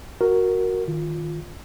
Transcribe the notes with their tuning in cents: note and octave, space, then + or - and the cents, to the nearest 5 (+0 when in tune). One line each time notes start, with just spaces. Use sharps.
F#4 +0 A#4 +0
D#3 +0 F4 +0